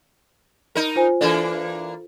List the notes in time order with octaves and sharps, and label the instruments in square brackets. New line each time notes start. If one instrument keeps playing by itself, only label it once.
[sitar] D#4 A#4
[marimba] F4 C5 G#5
[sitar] E3 A#3 D4 [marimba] A4